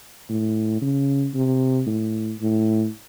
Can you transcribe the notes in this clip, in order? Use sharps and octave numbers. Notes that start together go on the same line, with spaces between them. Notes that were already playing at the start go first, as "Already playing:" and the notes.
A2
C#3
C3
A2
A2